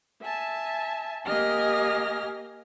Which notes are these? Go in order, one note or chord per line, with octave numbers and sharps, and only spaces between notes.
E5 G#5 A5
A#3 G4 D#5 G#5 F6 A#6